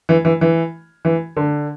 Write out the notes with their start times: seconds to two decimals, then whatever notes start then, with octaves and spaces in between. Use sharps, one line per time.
0.09 E3
0.25 E3
0.41 E3
1.05 E3
1.37 D3